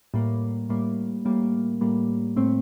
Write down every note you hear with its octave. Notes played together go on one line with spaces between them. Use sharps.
A2 G3 A#3
A2 G3 A#3
A2 G3 A#3
A2 G3 A#3
A2 A3 C4